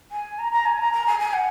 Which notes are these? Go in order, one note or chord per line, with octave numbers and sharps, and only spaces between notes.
G#5
A#5
A#5
G#5
A#5
A#5
G#5
G#5
F#5